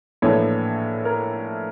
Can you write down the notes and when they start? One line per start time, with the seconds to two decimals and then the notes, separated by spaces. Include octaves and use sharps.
0.22 A#1 A2 E3 A#3 A4 C#5
1.05 A#4